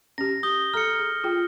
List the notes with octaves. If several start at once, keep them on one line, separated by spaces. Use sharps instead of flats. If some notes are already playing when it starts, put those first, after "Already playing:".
C#4 G4 A#6
D#6 G6 G7
A4 A#5 F6 C#7
G#4
F4 G#4 G5